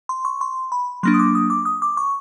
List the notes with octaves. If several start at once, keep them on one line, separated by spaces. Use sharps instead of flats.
C6
C#6
C6
B5
F#3 A#3 D4 C6
D#6
D6
D#6
D6
D#6
D6
C#6